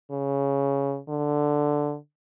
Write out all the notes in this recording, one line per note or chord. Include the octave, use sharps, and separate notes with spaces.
C#3
D3